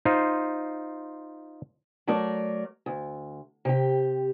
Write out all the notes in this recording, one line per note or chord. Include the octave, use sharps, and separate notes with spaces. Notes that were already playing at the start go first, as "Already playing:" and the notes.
D#4 F4 C5
F#3 A3 A#4 D5
D2
C3 G4